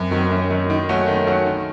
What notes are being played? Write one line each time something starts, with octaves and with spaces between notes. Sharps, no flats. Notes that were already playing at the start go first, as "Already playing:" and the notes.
Already playing: F#2 C4
D#3 F#3
F#2 C#4
D#3 F#3
D#3 D#4
F#3 A3 C#4 F#4
D#3
F#3 A3 C#4 F#4
D#3